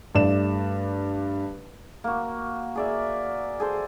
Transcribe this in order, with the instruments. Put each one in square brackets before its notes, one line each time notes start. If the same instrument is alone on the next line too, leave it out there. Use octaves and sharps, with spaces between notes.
[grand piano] G2 A3 D5 E7
[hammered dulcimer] A#3 F#4
G#4 D5 E5
G#4 A4 C5